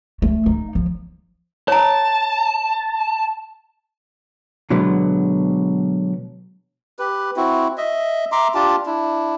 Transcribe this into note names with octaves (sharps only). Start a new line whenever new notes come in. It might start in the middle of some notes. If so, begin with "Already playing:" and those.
A3
D#4
F3
C#5 A5 A#5
B2 D3 F#3 G#3 B3
G4 B4
C4 E4 F#4
D#5 E5
E5 A#5 C6 D6
D4 F4 G4 A5
D4 E4